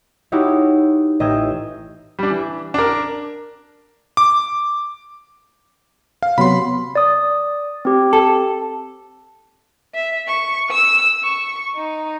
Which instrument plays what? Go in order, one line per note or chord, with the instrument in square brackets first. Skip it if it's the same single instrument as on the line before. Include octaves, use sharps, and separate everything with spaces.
[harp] D#4 E4 F#4 G4 C#5
A1 D#5 E5 G5 G#6 E7
[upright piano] G3 D4
E3
D4 A#4
[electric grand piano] D6
F5
[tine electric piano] C3 F#3 B3 [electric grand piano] B5 C6
[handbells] D5 D#6
C4 G4
[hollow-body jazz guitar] A4
[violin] E5
C#6
E6
C#6
D#4